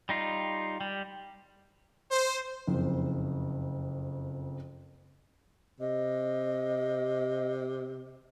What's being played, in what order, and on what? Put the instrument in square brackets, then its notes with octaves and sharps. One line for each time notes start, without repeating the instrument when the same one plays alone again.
[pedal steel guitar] G3 D#4 F4
G3
[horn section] C5
[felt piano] F#1 F2
[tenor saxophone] C3 [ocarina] D#5